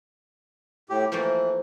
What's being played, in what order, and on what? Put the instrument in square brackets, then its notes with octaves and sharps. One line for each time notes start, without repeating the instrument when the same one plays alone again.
[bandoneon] A2 G4
[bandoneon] E3 [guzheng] F3 A3 A#3